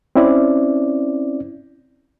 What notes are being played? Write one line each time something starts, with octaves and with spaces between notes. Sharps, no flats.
C4 C#4 E4 D5